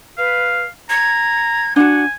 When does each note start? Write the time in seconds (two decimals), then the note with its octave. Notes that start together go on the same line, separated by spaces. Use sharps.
0.18 B4 F5
0.90 A#5 G#6
1.76 D4 F#4 F#5 G#5